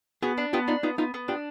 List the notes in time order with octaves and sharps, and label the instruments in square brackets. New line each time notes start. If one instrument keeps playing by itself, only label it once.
[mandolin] B3 [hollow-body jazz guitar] F#4 G#4
[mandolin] D4
[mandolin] B3 [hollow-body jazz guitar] F4 G4
[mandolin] D4 [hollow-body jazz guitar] D#4 F4
[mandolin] B3 [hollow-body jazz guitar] D#4 F4
[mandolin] B3 [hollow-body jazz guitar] D#4 F4
[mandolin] B3
[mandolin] D4 [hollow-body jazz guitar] F4 G4